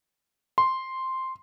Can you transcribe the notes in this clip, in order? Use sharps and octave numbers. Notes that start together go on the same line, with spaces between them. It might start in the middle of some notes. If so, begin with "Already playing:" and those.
C6